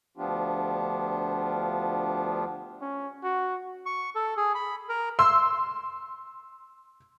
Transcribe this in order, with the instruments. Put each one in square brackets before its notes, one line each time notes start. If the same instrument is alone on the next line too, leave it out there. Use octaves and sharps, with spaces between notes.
[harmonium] D2 F3 B3 D4 F4 G4
[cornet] C#4
F#4
[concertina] C#6
A4
G#4
B5
A#4
[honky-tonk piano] C6 E6